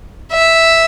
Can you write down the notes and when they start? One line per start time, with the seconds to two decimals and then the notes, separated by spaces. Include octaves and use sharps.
0.32 E5